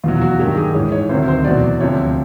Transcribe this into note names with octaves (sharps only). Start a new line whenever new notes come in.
E2 B2 F#3 F4
F#4
G2 D#3 F#3 G4
G#4
G#2 E3 C#5
C#5
D2 C3 D#3 F#3 C5
C5
E2 B2 F#3 D5
C5
D2 C3 F3 C#5